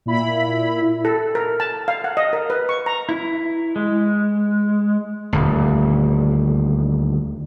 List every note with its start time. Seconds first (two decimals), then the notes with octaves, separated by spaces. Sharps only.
0.06 A#2 E4 B5
1.05 A4
1.35 A#4
1.60 A5
1.88 F5
2.04 F#5
2.17 D#5
2.33 A#4
2.50 B4
2.69 C#6
2.86 A#5
3.09 E4
3.76 G#3
5.33 D#1 D2